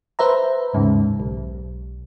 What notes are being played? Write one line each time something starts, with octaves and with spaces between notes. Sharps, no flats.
B4 C5 E5 A#5
D#2 G#2 C#3
B1